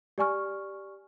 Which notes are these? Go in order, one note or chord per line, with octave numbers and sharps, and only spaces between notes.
G4 D5 G#5 C#6 F6